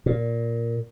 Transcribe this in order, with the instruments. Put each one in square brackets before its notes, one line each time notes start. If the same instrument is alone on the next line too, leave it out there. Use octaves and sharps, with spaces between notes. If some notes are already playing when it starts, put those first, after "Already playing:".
[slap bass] A#2